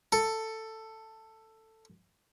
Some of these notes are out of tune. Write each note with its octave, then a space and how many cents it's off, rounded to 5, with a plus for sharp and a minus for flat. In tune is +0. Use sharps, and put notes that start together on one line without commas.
A4 +10